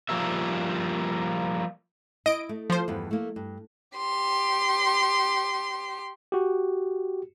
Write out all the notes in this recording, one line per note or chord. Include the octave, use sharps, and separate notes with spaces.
F3 G3 A#3 E5
E4 D#5 D7
A3
F3 C5
E2 G2 B3
A3 A#3
G2
G4 C6
F#4 G4